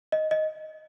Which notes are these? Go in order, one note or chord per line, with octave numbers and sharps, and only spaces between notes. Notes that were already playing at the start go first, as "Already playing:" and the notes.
D#5
D#5